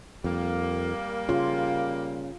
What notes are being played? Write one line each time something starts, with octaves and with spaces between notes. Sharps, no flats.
F2 G3 A#3
C#3 F4